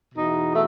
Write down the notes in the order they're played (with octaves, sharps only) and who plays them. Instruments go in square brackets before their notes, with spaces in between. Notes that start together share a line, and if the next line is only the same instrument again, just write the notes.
[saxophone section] E2 B2 D#4
A3